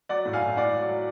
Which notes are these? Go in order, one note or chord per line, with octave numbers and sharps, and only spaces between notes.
F#3 D5 F#5
A2
F5 G#5
A2
A2 D5 F#5
F#3
F#3